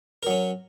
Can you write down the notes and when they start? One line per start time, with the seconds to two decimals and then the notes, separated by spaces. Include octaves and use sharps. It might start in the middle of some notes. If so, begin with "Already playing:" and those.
0.23 A#4
0.27 F#3
0.30 C#4